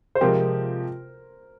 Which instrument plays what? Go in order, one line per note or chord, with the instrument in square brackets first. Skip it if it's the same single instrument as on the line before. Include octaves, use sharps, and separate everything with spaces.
[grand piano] C5
[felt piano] C3 F3 G#3 C4 G4 [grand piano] A#4